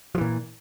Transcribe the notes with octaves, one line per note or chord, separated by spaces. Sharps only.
A#2 E3 F3